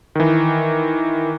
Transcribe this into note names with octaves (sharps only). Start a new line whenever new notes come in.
D#3 E3